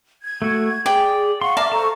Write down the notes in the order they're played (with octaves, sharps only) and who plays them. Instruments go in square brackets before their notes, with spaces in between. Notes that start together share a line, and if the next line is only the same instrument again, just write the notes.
[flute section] G#6
[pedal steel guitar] A3 F#4
[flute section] G#4 [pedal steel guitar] D5 [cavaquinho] G5
[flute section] F5 F#5 C#6 [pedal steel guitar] C6
[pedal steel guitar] D5 A5 A#5 [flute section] E5 D6 F6 [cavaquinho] F5
[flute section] A4 A#5 C#6 [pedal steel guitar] C5 A5